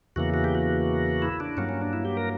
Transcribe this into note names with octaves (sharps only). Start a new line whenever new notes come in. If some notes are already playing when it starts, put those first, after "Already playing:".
E2 C#3 E3 A#3 F#4
F#4
G4
F#4
E4
D4
G2 F#3 A#3 C#4
C#4
D4
E4
G4
A#4